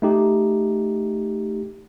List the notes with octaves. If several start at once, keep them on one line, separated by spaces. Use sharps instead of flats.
A3 D#4 G4